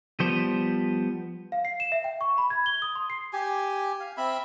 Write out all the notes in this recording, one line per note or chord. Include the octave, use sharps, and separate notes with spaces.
F3 G3 B3 C5
F5
C7
E7
E5
G5
C#6
B5
G#6
G7
D#6
C6
C7
G4 G#5
F5
C4 E5 B5